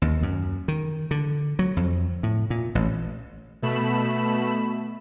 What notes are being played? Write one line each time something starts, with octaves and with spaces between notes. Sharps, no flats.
D#2
F#2
D#3
D3
F#3
F2
A2
A#2
A1
B2 A3 B5 E7